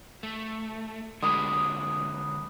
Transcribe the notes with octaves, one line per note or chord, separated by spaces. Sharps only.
A3
D3 F#3 G#3 B5 D6 D#6